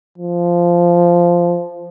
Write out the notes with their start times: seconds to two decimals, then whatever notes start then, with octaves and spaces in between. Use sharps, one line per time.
0.18 F3